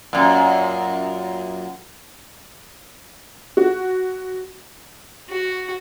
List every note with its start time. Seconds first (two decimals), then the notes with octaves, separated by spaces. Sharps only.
0.13 F#2 A#2
3.57 F#4
5.29 F#4